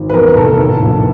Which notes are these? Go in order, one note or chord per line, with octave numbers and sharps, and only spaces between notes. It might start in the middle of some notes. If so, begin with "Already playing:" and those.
Already playing: G#1
B4
E2 A#4
F1 A4
A2
A#1